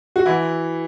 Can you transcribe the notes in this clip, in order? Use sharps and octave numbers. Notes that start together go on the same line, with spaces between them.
F#4
E3 E4